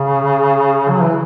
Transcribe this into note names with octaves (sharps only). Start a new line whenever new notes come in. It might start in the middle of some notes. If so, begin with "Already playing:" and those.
Already playing: C#3
F#3
E3